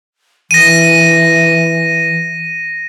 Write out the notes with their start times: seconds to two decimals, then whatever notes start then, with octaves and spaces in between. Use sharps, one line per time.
0.51 E3 A#6 D#7